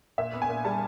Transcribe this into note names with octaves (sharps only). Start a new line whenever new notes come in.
A#2 E5
B3
G#5
A#2
G3 A5